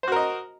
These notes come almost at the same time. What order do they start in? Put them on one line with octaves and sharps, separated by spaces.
C5 F#4 A#4 D#5